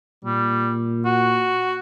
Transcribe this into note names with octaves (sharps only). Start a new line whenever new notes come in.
A#2 G3
F#4